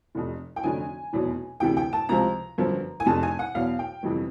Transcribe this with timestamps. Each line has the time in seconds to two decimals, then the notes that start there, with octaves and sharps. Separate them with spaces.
0.15 F1 F2 C3
0.56 G5
0.63 F1 F2 D3 F#3 G#5
1.13 F1 E2 B2 F#3
1.60 D2 C3 E3 G5
1.77 G5
1.93 A5
2.09 C#2 C3 F3 A#5
2.58 G1 F#2 D3 F3
3.00 G#5
3.06 F1 F2 C3 A5
3.23 G#5
3.39 F#5
3.55 E2 B2 F#3 F5
3.79 G5
4.03 G1 F2 C3 E3